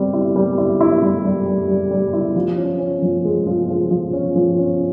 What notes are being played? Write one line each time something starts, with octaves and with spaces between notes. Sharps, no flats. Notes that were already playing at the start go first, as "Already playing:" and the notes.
Already playing: G3 C4
E4
G3
E4
E4
G3
G3
G3
G3
G3
E4
F3
C#4
C#4
F3
G#3
F3
F3
F3
C#4
F3
C#4